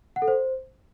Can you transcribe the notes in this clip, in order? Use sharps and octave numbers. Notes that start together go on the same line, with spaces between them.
F#5
A4
C5